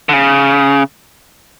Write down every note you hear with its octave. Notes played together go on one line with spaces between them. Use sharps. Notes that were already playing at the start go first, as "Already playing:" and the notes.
D3
C#3